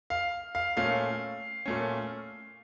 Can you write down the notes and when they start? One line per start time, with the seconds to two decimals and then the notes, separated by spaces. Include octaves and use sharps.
0.10 F5
0.55 F5
0.77 A#2 A3 C#4 F5
1.66 A#2 A3 C#4